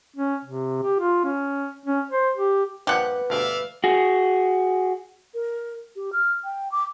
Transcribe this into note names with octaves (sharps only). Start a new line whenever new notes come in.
C#4
C3
G4
F4
C#4
C#4
C5
G4
G2 A#2 F3 G4 B4 F#5
D2 G2 B2 D5 E5 F5
F#4 G#4
A#4
G4
F6
G5
D6